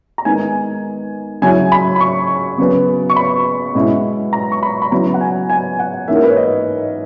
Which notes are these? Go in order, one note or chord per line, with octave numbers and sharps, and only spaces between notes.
A#5
D#3 G#3 B3 D#4 G#5
C#3 F#3 C#4 E4 G#5
B5
B5
C#6
C#3 F#3 B3
C#6
B5
B2 G#3 C#4 E4
A#5
C#6
B5
B5
C#3 F#3 B3 E4 A#5
F#5
G#5
G#5
F#5
G#2 E3 A#3 C#4 E5
A#4
B4
C#5
D#5